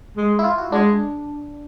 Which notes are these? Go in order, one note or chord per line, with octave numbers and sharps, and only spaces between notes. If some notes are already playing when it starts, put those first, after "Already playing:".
G#3
E4
F4
F#4
G#3 D4